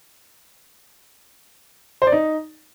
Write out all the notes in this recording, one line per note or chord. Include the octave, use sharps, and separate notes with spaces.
C5
D5
D#4